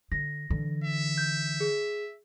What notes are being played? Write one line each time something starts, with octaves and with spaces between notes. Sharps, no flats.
D3 A#6
D3 E3
E5
G6
G#4